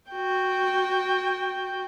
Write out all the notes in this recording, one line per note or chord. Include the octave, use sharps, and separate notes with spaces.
F#4 G5